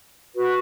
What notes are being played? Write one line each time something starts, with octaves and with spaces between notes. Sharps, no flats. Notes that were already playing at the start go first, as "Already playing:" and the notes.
F#4 B4